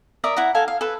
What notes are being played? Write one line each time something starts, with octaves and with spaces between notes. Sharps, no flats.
A#4 D5 E5 D#6
E4 F#5 A#5
A4 F5 G#5
F5
A4 B4